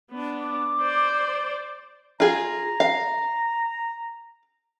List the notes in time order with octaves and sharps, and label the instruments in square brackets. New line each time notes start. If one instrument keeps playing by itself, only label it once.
[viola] B3 D4
[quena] D6
[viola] C5 D5
[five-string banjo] F4 G#4 [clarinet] A#5
[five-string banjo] F5